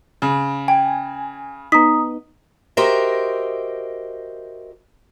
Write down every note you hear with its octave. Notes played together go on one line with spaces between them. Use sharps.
C#3
G5 G#5
B3 D#4 A#5 D#6 B6
F#4 G4 A#4 C5 D#5 E5